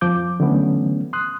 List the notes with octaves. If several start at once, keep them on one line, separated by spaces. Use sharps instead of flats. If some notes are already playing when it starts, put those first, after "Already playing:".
F2 F3 D6 G6
D3 E3 F#3 A3 B3 C#4
C6 D#6 F#6